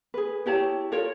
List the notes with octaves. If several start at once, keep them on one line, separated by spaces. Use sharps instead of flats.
G#4 B4
E4 G4 C#5 A5
F4 A4 A#4 C#5